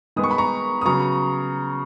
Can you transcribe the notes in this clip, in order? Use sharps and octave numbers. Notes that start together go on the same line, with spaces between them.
D#3 G#3 B3 D#6
C#6
B5
A#5 C#6
D#6
C#3 F#3 B3 A#5 C#6